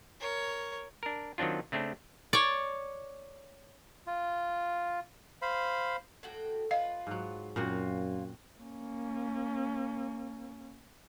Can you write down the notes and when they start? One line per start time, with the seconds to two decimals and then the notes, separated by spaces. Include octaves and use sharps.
0.20 A#4 C#5
1.03 D4 A#4
1.38 D#3 F#3 C4 D4 F4
1.72 C#3 A3 C4 D4
2.33 C#5 D5
4.07 F4
5.42 C5 F5 B5
6.23 A2 F#4 G5
6.71 F4 B4 D#5 F5
7.07 G#2 F#3
7.56 F#2 A#2 A#3 C4 F4 F#4
8.59 A#3 C#4